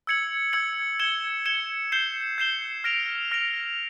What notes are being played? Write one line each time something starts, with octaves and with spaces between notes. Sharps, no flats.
E6 G#6 C#7 F#7
E6 G#6 C#7 F#7
G#6 C#7 E7 G7
G#6 C#7 E7 G7
G6 C7 E7 G7
G6 C7 E7 G7
F6 A#6 D7 F7
F6 A#6 D7 F7